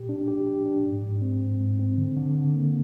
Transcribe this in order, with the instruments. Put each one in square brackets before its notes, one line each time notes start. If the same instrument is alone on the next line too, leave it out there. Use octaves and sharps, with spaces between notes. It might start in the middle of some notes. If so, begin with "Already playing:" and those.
Already playing: [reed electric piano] A#2 G4
D4
G4
G4
D4
G#2
G#2
C4
G#2
G#2
C4
D3
D3
D3
A#3